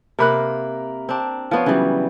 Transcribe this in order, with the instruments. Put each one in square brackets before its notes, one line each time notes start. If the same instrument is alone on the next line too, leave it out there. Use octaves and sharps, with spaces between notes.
[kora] C3 A#3 [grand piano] A#4 B5 F#6
[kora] C4 D4
[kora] F3 B3 [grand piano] F4 C#5
[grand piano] C#3 F#3 [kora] E3 G3